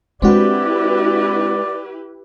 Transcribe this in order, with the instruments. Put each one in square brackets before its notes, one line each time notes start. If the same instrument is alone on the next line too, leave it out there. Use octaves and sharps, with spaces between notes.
[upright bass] G#3 [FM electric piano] C4 D4 F#4 [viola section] E4 G4 B4 [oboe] D5